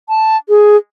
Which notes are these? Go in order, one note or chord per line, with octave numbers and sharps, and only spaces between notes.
A5
G#4